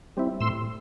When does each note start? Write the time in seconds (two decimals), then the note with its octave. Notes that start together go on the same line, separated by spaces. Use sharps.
0.17 G3 C4 E4
0.40 A2 C6 E6